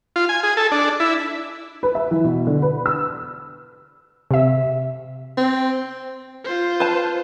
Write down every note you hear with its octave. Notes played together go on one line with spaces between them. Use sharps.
F4
G#5
G#4
A4
D4
E4
B4
E5
E3
B2
D3
B4
E6
C3 E5
C4
F4 C5
B4 A5